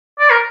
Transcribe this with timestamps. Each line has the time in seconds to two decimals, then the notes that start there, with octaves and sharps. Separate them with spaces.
0.19 D5
0.30 A#4